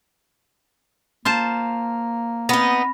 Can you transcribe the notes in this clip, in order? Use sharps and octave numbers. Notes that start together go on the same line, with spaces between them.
A#3 F4 C5 A5
B3 C4 D#4 B5 A#6